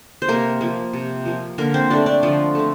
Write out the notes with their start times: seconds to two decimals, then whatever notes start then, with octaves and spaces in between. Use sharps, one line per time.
0.22 C5
0.28 C3 A#3 A#4
0.61 F3 A#3
0.93 C3
1.25 F3 A#3
1.58 D3 A#3 A#4
1.74 C4 C5
1.90 A3 C4 D4 D5
2.06 D4 D5
2.22 D3 F3 F4
2.55 A3 C4